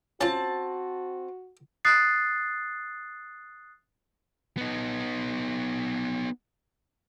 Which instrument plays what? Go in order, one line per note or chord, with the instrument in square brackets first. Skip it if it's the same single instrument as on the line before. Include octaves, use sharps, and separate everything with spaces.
[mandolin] C4 A5 [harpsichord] C#4 F4 [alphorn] F#4
[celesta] D#6 F#6 A6 C7
[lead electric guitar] B3 D#4